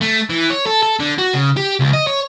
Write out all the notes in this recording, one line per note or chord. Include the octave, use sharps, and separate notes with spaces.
A3
E3
C#5
A4
A4
D3
F#4
C#3
G4
C#2
D#5
C#5